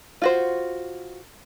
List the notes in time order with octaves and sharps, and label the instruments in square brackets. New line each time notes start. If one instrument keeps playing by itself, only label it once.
[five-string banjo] F4 F#4 C5